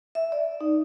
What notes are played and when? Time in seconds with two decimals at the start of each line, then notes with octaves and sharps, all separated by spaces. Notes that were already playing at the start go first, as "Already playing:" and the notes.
0.15 E5
0.32 D5
0.61 D#4